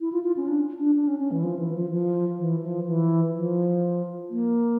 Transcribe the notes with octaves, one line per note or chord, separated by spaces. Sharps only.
E4
F4
F4
C#4
D4
D4
D4
C#4
C#4
E3
F3
E3
F3
F3
E3
F3
E3
F3
A#3